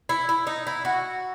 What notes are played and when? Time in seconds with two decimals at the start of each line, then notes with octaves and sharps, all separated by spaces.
0.09 E4
0.29 E4
0.47 D#4
0.67 E4
0.85 F#4